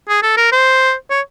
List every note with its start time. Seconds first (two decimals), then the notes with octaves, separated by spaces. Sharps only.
0.08 G#4
0.22 A4
0.37 A#4
0.52 C5
1.10 C#5